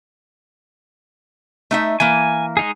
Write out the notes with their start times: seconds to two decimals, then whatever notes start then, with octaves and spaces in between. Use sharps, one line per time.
1.71 A3 D#4 E5
2.00 E3 A#3 G#5
2.57 G#3 D#4 G#4